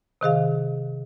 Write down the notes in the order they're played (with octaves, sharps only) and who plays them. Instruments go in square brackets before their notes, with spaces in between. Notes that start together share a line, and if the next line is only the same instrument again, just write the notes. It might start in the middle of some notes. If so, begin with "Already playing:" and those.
[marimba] C3 D#3 G#4 F5